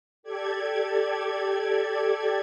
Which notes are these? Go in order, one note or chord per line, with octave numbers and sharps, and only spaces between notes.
G4 A4 D5 G#6